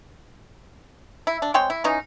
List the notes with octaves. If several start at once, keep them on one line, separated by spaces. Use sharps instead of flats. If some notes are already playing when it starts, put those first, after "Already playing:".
E4
D4
G#3 C4 C#5 G5
E4
E3 C#4 D#4